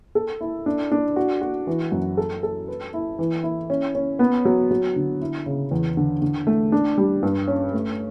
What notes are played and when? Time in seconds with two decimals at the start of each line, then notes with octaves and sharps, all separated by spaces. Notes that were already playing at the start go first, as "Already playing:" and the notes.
0.15 A4
0.41 E4
0.66 D4
0.92 D4
1.16 F#4
1.41 F#4
1.67 E3
1.92 F#2
2.17 A4
2.43 A4
2.68 B4
2.94 E4
3.19 E3
3.43 E4
3.70 C#4
3.95 C#4
4.19 B3
4.45 F#3
4.71 F#3
4.96 D3
5.21 E4
5.46 C#3
5.71 E2
5.97 D3
6.22 D3
6.47 A3
6.72 D4
6.98 G3
7.23 G2
7.48 C#4
7.73 A3